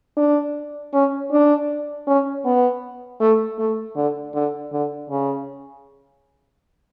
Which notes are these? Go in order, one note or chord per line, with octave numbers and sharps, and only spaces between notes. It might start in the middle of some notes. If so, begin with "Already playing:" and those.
D4
C#4
D4
C#4
B3
A3
A3
D3
D3
D3
C#3